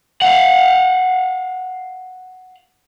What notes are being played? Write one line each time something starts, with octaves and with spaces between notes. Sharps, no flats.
F5 F#5